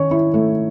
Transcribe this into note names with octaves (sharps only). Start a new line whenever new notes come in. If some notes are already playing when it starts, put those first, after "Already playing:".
Already playing: D#3 C#4 C#5
E4
A3